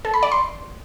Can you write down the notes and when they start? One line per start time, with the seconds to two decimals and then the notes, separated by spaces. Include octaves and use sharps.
0.05 A4
0.14 B5
0.23 D5
0.32 C6